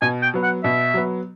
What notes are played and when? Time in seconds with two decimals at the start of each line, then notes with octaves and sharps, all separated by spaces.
0.02 B2 G#5
0.22 G5
0.34 F#3 B3
0.43 F#5
0.64 B2 E5
0.94 F#3 B3